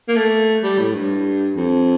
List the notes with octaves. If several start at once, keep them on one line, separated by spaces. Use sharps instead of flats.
A#3
A3
G3
A2
G2
F2